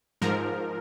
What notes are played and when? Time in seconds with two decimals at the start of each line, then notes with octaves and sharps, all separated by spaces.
0.22 G#2 F3 A#4